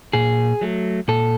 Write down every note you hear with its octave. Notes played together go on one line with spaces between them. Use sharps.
A#2 G#4
F#3 A3
A#2 A4